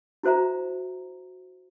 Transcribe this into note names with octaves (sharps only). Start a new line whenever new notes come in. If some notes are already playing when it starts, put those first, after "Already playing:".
E4 F#4 C5 E5 A#5